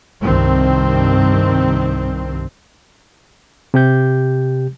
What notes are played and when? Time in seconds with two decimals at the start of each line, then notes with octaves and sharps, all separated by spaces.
0.23 C2 G2 D#3 C4
3.74 C3 G4 G6